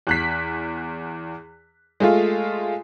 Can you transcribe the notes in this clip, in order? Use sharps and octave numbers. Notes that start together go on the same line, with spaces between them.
E2 F#6 B6
G#3 A3 F4